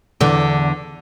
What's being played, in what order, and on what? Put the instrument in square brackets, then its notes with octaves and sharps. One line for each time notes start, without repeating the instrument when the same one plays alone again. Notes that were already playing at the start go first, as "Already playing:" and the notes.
[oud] E2 D3